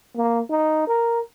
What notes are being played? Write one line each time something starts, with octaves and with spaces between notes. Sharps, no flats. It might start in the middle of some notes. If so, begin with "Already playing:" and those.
A#3
D#4
A#4